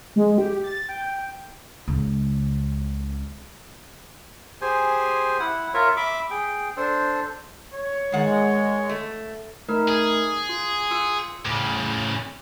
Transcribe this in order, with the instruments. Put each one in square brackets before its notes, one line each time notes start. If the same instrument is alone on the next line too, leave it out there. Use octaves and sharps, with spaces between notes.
[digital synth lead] G#3
G4
A6
G5
[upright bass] C#2 C#3
[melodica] G4 G#4 C5 G#5
E4 F#5
F4 A#4 C#5 E5
E5 B5 D6
G#4 G5
D4 A4 C5
[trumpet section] C#5
[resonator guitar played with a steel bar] D#3 F#5 [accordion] G#3
[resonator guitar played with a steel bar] A3
[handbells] A3 D#4 A#4
[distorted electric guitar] G#4
[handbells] F4
F4 E6 C#7
[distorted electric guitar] A2 C#3 [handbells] D6